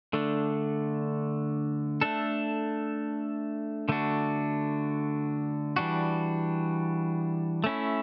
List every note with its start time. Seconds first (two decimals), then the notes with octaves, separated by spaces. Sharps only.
0.13 D3 A3 D4
2.01 A3 D4 A4
3.89 D3 A3 D4 F#4
5.76 E3 G3 D4 F#4
7.64 A3 C#4 E4